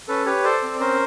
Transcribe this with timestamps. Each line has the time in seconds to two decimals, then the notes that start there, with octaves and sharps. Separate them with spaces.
0.08 C#4 A4 B4
0.26 G4 B4 C#5
0.44 A4 C5 D5
0.63 C4
0.80 C#4 A#4 C5